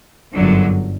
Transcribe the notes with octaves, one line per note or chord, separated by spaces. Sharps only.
G1 F#2 D3 F#3